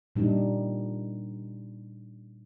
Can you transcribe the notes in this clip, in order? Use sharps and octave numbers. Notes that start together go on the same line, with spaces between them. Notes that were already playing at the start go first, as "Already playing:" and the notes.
A#2 G3 D4 D#4